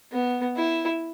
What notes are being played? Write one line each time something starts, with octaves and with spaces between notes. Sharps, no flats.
B3
E4